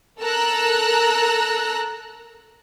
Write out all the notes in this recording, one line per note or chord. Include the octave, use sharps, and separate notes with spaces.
A4 A#4 A#5 E6 F#6